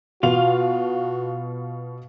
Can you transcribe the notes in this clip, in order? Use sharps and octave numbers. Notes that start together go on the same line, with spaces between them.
B2 F4 F#4 F5 F7